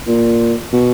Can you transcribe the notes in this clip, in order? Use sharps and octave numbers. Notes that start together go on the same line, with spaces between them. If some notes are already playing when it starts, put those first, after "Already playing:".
A#2
B2